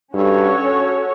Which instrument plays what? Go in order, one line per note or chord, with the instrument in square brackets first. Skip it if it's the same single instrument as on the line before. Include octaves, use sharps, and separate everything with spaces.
[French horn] G2 [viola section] C#4 F#4 A4 C#5